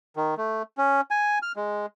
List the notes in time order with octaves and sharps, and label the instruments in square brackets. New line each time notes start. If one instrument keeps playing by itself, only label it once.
[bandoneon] D#3
A3
C#4
G#5
F6
G#3